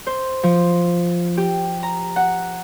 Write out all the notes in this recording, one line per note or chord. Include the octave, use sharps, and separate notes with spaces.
C5
F3
G4
A#5
F#5